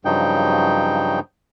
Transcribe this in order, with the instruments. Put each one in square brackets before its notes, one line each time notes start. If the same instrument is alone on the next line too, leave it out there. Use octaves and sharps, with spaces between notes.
[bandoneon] G2 C#3 F3 F#3 D#4 G5